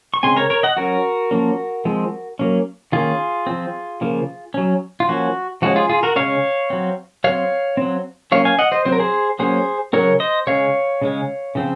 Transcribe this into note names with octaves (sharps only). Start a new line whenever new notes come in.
C#6
C#3 G#3 C4 G#5 C6
A#4 C#5
A#4 C#5
D#5 F#5
F#3 C#4 F#4 A#4
F3 A#3 C#4
F3 G#3 C4
F#3 A#3 C#4
D#3 A#3 C#4 F4 G#4
F3 C4
C#3 F3 A#3
F#3 C#4
F4
F3 A#3 C#4 F#4
F3 G#3 C#4 F#4
F4 G#4
F4 G#4
F#4 A#4
C#3 G#3 C#4 C#5 F5
F#3 C4
F#3 C4 C#5 F5
F#3 C4
F#3 A#3 C#4 C#5 F5
F5 G#5
D#5 F#5
C5 D#5
F#3 C4 C5
A#4
G#4 C5
F#3 A#3 C#4 G#4 C5
C#3 F#3 C4 A#4 C#5
C5 D#5
C#3 G#3 C#4 C#5 F5
C#3 G#3 C#4
C#3 F3 C4